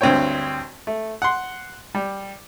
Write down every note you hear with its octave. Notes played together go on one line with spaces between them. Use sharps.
D2 G2 C4 G4 C#5 G5
A3
F#5 C6
G3